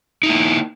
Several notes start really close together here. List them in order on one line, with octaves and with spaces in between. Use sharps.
D#4 E4 A#3